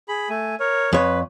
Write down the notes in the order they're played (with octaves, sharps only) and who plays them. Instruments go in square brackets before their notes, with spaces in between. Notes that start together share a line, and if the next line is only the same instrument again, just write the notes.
[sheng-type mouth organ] G#4 B5
A3 G#5
A#4 C#5
[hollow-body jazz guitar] F2 C#5 [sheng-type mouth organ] B4